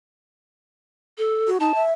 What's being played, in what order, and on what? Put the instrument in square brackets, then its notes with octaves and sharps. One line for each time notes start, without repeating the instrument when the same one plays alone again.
[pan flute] A4
[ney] F#4
[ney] D#4 [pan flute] A5
[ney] E5